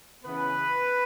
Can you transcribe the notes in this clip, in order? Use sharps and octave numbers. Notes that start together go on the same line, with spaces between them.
C#3 E3 B3 B4